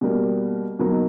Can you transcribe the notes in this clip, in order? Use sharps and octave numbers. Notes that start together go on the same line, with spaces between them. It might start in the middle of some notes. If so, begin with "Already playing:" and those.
B2 G3 A#3
B2 F#3 A#3 D#4